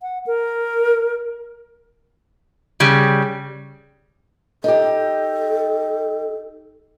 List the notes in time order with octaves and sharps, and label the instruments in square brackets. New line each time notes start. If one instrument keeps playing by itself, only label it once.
[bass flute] F#5
A#4
[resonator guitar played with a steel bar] C#3 G3
[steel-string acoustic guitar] D#4 G4 [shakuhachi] A4